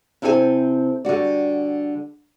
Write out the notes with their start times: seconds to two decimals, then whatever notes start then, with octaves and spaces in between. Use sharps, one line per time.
0.22 C3 C4 E4 A4 C#5 G#5
1.05 D3 G3 F#4 D5